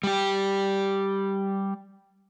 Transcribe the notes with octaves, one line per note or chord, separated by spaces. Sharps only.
G3 G4